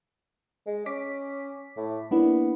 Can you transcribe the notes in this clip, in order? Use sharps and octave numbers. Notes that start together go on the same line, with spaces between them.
G#3
C#4 D6 B6
A2
A#3 B3 D4 E4